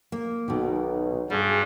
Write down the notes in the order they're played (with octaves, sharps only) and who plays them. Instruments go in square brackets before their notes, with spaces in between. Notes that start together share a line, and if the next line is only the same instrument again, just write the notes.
[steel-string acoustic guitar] A#3
[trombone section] B1 [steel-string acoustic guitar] B2 D#3
[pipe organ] G2 G3 [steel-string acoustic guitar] F#4 [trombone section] G#4